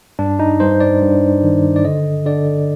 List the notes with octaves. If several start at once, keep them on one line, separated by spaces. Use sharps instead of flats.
G2 D4
D#4
G2 C5
D5
G2
D#3
D5
D3 D#5
D3 D5